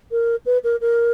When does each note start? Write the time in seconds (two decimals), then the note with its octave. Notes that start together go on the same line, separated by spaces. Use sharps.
0.11 A#4
0.45 B4
0.63 A#4
0.81 A#4